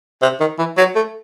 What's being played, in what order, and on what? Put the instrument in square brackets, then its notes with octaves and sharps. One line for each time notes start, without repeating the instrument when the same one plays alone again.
[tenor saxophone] C3
D#3
E3
F#3
A3